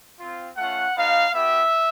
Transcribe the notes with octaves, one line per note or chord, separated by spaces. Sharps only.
C4 F4
A3 C#4 F4 F#5
B3 D#4 F#4 F5
B3 E4 G4 E5